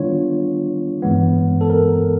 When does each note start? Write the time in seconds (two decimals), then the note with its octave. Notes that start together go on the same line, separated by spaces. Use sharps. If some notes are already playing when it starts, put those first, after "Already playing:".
Already playing: D#3 G3 B3 D4 F4 C#5
1.02 G2 E3 G#3 B3
1.61 A4
1.70 A#4